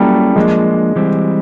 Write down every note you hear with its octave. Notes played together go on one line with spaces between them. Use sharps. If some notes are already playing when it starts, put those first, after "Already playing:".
Already playing: F#3 G3 A#3 C#4 E4 A4
F3 G#3 A#3 D4
E3 G3 C4